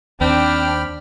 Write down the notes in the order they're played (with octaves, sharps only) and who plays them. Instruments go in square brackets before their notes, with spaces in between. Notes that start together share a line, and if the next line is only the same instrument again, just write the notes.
[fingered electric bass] D#2 [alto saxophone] C4 [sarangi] D4 [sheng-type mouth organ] G5 B5 F6